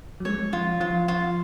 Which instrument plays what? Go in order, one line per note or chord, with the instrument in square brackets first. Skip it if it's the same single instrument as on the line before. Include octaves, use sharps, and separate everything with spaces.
[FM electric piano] F#3
[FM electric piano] G#3 [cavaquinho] C#5
[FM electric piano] F3 [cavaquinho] F4
[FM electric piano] F3 [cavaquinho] F4
[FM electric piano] F3 [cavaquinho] F4